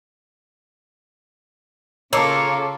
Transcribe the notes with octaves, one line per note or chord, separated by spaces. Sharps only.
C#3 A#3 F4 A4 C#5 A5 D6 E6